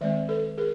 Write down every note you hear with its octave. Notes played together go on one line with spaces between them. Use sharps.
D#3 G#3 C4 D5 E5
A4 B4
G#4 A#4